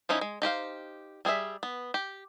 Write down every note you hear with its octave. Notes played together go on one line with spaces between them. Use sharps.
F3 C#4 D#4 E4
G#3
D#4 G4 C5 F5
G3 G#4 A4 E5
B3
G4